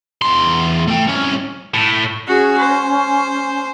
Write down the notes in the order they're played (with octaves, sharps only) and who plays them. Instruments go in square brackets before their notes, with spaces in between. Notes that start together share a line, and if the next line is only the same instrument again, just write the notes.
[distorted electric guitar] E2 C6
A3 G5
C2 C#4
A2
[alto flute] C#4 [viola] F#4 G#4
[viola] C5